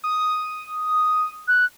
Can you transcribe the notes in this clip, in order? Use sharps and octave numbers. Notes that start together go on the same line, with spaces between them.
D#6
F#6